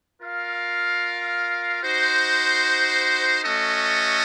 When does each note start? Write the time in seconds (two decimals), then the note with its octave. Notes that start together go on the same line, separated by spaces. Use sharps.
0.22 F4 A#4 F5
1.83 D#4 F#4 C5
3.44 A3 C#4 F#4 A4 D#5